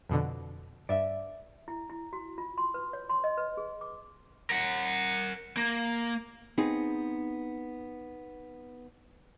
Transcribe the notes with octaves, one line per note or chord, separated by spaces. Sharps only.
F2 B2 D3
G2 D5 E5
E4
E4
F#4
F4
C6
B4
C#5
C6
D#5
B4
G#4
D6
A#4 F#5
A#3
B3 C4 D#4 G#4